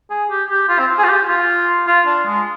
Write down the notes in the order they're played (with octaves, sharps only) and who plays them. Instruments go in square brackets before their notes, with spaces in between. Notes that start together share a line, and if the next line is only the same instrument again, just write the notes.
[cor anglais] G#4
G4
G4
F4
C4
G#4
F4
G4
F4
F4
D4
G#3